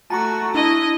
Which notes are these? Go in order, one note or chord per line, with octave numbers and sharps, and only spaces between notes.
A3 F#4 A5 A#5 C#6
D4 E4 D#5